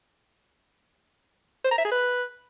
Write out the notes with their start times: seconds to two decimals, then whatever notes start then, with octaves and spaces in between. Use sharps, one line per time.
1.64 C5
1.71 A#5
1.78 E5
1.85 G#4
1.91 B4